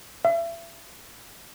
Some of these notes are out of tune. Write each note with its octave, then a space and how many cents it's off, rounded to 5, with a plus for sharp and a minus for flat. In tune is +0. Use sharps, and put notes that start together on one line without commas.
E5 +35